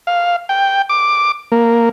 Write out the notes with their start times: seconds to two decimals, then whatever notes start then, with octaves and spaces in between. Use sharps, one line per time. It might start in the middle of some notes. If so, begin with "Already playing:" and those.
0.07 F5
0.49 G5
0.89 D6
1.52 A#3